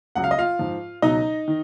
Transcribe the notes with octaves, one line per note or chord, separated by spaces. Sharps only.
C#2 C#3 F#3 F#5
F5
D#5
F4 F5
G#2 F3
C#2 B2 F#3 D#4 D#5
D#3